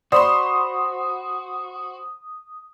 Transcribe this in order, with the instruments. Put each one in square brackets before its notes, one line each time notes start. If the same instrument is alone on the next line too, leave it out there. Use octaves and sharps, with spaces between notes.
[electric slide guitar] F#4 [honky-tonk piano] C5 B5 C6 [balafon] D5 [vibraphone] D#6